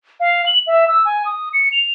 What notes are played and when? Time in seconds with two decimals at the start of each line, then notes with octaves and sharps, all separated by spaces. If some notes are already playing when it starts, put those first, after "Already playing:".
0.20 F5
0.46 F#7
0.67 E5
0.88 E6
1.05 G#5
1.25 D#6
1.53 C#7
1.72 F7